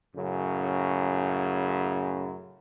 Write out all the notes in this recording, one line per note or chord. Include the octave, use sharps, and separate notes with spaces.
F#2 A2 C#3